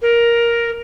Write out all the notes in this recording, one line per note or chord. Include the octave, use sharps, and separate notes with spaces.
A#4